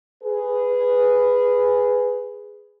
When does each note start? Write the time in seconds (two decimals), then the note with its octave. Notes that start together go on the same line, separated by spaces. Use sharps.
0.23 G#4 B4